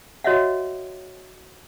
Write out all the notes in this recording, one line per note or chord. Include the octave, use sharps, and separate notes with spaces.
F#4 C#5 D#5 E5 F#5